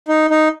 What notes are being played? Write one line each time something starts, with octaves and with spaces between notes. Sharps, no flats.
D#4
D#4